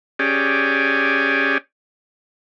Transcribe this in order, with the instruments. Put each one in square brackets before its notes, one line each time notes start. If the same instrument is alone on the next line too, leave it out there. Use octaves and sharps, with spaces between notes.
[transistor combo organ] C#4 G4 G#4 D5